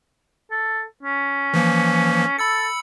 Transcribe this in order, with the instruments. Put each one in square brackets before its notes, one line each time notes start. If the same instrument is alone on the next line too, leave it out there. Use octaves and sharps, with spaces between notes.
[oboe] A4
C#4
[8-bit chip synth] E3 F3 A#3
[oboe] A4 [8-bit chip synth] B5 E6 C#7